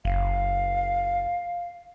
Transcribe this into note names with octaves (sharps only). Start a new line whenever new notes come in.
F#1 F5